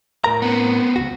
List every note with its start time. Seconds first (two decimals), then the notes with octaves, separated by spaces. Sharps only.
0.24 A2 A#4 A#5
0.42 B3 C4
0.96 C#2 F#2 F#4